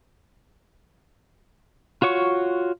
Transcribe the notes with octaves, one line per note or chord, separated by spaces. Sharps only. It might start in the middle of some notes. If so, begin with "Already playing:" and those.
F4 F#4 C#5 C#6